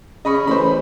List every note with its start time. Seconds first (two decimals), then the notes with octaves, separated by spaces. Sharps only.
0.25 C#3 D#5 B5 C#6
0.47 A1 C5 B5